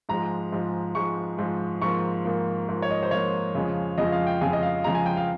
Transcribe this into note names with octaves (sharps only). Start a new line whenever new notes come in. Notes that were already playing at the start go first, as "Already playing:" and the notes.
G#2 F3 G#3 A#5
G#2 F3 G#3
G#2 F3 G#3 C#6
G#2 F3 G#3
G#2 F3 A#3 C#6
G#2 F3 A#3
G#2 F3 A#3
C#5
D#5
C5
G#2 F3 A#3 C#5
F2 C#3 F3 G#3
F2 C#3 F3 G#3 D#5
F5
G5
F2 C#3 F3 G#3 G#5
D#5
F5
F2 C#3 F3 G#3 A#5
G#5
G5
F5